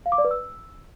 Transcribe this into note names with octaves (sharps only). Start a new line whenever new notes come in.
F5
D6
D5
B4
E6